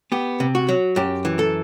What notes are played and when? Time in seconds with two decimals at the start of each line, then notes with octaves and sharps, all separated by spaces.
0.12 B3 G4
0.40 C3
0.55 F#4
0.69 F#3
0.96 F#2 G4
1.25 E3
1.39 A4